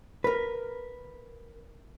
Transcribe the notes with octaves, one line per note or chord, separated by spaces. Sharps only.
A#4 B4